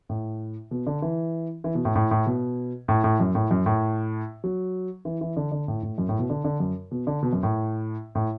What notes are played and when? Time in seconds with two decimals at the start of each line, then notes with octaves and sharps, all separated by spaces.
0.09 A2
0.71 B2
0.87 D3
1.02 E3
1.64 E3
1.75 B2
1.85 A2
1.95 A2
2.11 A2
2.26 B2
2.88 A2
3.04 A2
3.20 F#2
3.35 A2
3.51 F#2
3.66 A2
4.44 F#3
5.05 E3
5.21 E3
5.37 D3
5.52 D3
5.68 A2
5.83 A2
5.98 F#2
6.09 A2
6.19 B2
6.30 D3
6.45 D3
6.60 F#2
6.91 B2
7.07 D3
7.23 B2
7.33 F#2
7.43 A2
8.15 A2